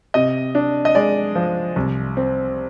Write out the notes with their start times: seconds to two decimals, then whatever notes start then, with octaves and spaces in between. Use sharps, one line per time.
0.14 C3 D#5
0.55 D4
0.85 D#5
0.95 G#3 D5
1.35 F3
1.76 C2
2.17 C4